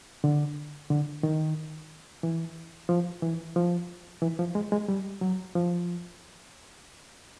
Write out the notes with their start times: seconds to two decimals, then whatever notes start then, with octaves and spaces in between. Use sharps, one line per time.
0.24 D3
0.90 D3
1.23 D#3
2.23 E3
2.89 F3
3.22 E3
3.56 F3
4.22 E3
4.39 F3
4.55 G#3
4.72 G#3
4.88 G3
5.21 F#3
5.55 F3